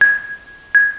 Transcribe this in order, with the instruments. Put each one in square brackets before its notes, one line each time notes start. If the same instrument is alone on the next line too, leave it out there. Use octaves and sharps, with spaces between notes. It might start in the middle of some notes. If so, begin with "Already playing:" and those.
[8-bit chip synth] G#6